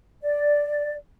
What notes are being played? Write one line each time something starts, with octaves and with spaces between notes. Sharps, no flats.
D5